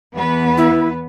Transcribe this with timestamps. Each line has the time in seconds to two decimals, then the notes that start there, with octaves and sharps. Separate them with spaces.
0.14 E2 B3 B4
0.57 E4